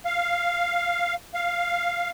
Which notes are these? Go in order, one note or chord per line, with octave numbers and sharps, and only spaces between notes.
F5
F5